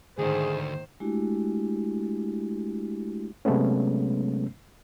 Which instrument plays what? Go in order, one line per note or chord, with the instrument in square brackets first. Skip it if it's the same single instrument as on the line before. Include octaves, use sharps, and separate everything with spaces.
[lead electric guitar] D2 [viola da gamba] G#2 D#3 [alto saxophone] G#4 [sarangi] C5
[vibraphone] G#3 A3 D4 E4 F#4 G4
[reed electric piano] C3 F#3 G#3 A3 B3 C#4